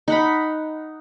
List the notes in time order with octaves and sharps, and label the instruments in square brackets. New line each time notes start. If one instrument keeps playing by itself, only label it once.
[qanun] D#4 F#5 B5